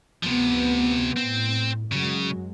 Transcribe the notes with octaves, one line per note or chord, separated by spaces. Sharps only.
D2 C3 F3 B3
A2 C4
F#2 C#3 F#3 G#3